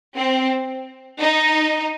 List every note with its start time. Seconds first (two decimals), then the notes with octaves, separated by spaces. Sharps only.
0.16 C4
1.20 D#4